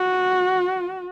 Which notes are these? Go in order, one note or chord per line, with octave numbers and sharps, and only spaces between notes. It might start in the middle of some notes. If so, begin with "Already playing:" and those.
Already playing: F#4